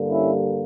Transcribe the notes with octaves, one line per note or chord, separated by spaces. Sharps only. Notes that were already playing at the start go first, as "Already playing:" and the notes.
Already playing: G2 D3 G3 A#3
C#4 E4